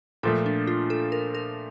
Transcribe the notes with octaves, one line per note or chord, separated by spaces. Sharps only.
A#2 F3 A3 A4
D4
F4
A4
A#4
A#4